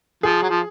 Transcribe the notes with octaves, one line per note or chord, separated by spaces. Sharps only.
F3 G#4
F#3
F3